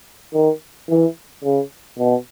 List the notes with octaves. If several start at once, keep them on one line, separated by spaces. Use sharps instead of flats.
D#3
E3
C#3
B2